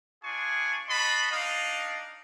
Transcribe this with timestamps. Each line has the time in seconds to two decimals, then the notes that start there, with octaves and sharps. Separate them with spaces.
0.23 D4 F4 G#4 G#5 C#6
0.89 F#4 D#5 A5 B5 C6
1.31 D4 D#4 D#5 F5